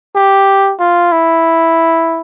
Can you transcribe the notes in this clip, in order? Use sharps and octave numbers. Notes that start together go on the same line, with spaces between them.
G4
F4
E4